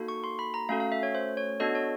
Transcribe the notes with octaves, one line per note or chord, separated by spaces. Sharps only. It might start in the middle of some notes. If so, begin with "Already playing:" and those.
Already playing: A#3 D#4 F#4 A4
C#6
C6
B5
A#5
A3 C#4 F#4 A4 F5
F5
E5
C#5
C5
C#5
B3 D4 F#4 A4 D#5
C#5